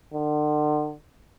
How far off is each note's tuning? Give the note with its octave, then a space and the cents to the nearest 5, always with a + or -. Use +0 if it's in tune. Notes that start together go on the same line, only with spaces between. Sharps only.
D3 +40